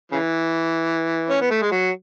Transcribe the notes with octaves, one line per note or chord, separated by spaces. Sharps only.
C#3 E3
C#4
B3
A3
G#3
F#3